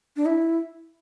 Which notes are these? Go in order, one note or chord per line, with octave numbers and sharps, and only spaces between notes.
D4
E4